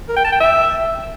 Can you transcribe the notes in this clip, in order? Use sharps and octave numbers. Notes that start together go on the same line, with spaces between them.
A#4
G5
A5
G5
E5